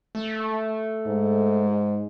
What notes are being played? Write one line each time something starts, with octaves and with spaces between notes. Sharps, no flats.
A3
G#2